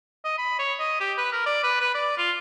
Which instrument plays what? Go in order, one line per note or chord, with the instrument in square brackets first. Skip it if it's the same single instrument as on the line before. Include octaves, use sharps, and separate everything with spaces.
[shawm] D#5
B5
C#5
D#5
G4
B4
A#4
D5
B4
B4
D5
F4